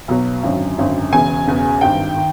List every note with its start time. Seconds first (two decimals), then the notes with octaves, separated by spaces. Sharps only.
0.08 B1 B2 F#3
0.43 G#1 F#2 D3 F#3
0.78 G#1 F#2 D3 F#3
1.13 E1 E2 C#3 G#5
1.47 E1 E2 C#3
1.81 G#1 G2 D#3 G5
2.16 D#3